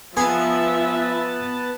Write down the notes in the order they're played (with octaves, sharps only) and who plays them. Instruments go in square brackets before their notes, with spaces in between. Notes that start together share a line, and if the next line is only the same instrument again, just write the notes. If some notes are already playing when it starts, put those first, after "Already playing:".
[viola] F3 E5 [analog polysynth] B3 A5 [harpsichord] G#4 G#5